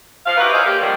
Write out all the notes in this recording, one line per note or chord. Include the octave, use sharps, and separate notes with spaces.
F3 F5
D#4 E4 F#4 G4 B4
G#4 A#4 C5 C#5 D#5 F5
A#3 G4
A#2 D3 D#3 F3 G3